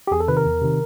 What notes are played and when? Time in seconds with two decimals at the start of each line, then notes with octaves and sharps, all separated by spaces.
0.07 G4
0.11 E2 G#4
0.20 A4
0.28 C3 D#3 B4
0.37 A#4
0.45 E2
0.62 C3 D#3